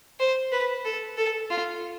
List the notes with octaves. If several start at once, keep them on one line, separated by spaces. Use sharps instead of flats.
C5
B4
A4
A4
F4